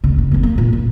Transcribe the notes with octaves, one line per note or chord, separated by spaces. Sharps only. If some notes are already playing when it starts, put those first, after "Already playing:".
D2 C#3
F#1
F#3 B3
A#3
A#2
D#4